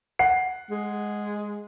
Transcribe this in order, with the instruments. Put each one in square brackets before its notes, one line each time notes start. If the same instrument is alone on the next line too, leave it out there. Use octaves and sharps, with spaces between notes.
[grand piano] F#5 C7
[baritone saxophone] G#3